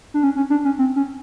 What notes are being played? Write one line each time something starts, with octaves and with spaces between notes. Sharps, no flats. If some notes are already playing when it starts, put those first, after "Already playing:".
D4
C#4
C#4
D4
C#4
C4
C#4